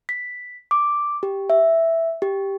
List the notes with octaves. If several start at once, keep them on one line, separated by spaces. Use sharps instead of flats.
B6
D6
G4
E5
G4